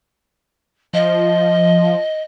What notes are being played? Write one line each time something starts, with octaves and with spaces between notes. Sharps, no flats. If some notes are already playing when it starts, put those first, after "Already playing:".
F3 D#5